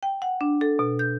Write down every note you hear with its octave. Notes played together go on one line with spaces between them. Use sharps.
G5
F#5
D4
A4
B2
G6